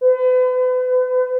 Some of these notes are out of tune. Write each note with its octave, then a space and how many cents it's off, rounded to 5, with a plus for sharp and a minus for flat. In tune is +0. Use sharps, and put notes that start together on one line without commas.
B4 +40